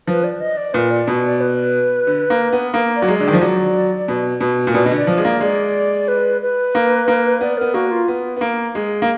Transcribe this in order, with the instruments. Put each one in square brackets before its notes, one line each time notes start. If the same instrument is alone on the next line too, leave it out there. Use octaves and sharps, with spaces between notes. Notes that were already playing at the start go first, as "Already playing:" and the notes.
[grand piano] F3 [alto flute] B4
[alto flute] D5
D#5
D5
[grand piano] A#2 [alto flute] B4
[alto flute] D5
[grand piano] B2
[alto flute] D5
B4
[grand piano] D3
A#3
B3
A#3
[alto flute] D5
[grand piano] F#3
G#3
[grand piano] D3 [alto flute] D5
[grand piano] D#3
F3
[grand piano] F#3 [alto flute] D5
[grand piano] B2
B2
A#2
[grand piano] B2 [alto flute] D5
[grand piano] B2 [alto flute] D#5
[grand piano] D3
[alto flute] D5
[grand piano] F3
G#3
A#3
[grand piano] G#3 [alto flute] D5
[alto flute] B4
B4
[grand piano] A#3
A#3
[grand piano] B3 [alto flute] D5
[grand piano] B3 [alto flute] A#4
[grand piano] A#3 [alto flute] F#4
[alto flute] F4
[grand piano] B3
B3
A#3
G#3
A#3